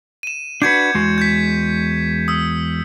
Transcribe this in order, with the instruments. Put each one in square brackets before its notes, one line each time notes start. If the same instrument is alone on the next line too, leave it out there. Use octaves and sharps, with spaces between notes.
[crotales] D#7 E7
[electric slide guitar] D4 F#4 B4 [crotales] G6 G#6 C#7
[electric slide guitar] E2 G#3 F#4
[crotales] G6 G#6 B6
D#6 E6